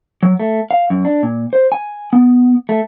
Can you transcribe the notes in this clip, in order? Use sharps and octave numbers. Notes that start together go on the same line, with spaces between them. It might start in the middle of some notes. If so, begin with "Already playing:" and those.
F#3
A3
F5
F#2
D4
A#2
C5
G#5
B3
A3